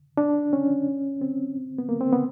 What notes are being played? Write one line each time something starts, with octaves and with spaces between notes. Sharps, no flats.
D4
C#4
C4
B3
A#3
C4
B3